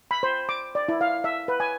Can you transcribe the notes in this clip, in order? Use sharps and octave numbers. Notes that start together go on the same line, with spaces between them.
B5
C5
D6
D5
E4
F5
E5
B4
G#5